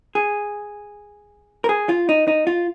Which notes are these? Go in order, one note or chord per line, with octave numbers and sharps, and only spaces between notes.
G#4
A#4
G#4
F4
D#4
D#4
F4